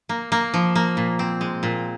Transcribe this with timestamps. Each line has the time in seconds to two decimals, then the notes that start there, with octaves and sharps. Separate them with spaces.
0.09 A#3
0.32 A#3
0.54 F3
0.75 A#3
0.97 A#2
1.19 C4
1.41 G#3
1.63 A#2